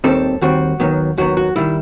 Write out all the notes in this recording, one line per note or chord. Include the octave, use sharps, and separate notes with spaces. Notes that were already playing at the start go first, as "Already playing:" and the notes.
D#2 D#3 G3 C4 A4
D#2 D#3 G3 C4 F#4
D#2 D#3 F#3 B3
D#2 D#3 F#3 B3 F#4
F#4
D#3 G3 E4